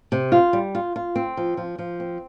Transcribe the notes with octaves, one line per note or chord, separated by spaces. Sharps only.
C3
F4
G3
F4
F4
C4
F3
F3
F3
C4